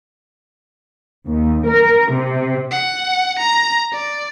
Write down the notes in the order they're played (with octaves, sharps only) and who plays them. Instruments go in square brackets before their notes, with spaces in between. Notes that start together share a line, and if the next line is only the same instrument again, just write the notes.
[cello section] D#2
A#4
C3
[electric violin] F#5
A#5
D5